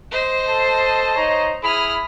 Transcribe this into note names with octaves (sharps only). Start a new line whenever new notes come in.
C5 D#5
A4 A5
D#4 C#5 A#5
E4 G#4 B5 D#6 F6